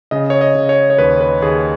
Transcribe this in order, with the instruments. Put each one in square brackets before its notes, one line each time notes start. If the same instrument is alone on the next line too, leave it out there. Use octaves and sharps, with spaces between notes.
[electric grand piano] C#3 D#5
C#5
D#5
C#3
C#5
C#5
D#2 B4
B4
D#2 G#4